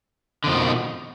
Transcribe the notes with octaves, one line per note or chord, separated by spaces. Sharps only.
F2 B2 D3 D#3 F3